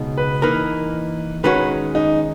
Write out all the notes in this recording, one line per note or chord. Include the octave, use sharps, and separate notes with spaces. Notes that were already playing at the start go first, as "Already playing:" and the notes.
Already playing: C#2 B2 G#3 D#4
B4
E3 A#3 D#4 A#4 B4
D#3 G#3 C#4 F#4 B4
D#4